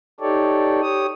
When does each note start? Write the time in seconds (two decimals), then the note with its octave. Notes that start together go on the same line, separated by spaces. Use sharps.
0.20 D#4 G4 A4 C#5 D5
0.82 G4 C#5 D#6